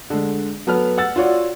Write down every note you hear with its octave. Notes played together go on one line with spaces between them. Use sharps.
D3 G#3
F#3 B3 A4 B4 F6
F#5 E6 A6
F4 F#4 C#5 D5